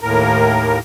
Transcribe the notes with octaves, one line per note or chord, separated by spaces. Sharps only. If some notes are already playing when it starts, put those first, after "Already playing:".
D#2 A2 A#4